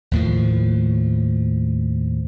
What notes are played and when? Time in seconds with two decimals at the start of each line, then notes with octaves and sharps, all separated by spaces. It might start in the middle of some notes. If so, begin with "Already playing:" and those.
0.11 D#2 A2 F3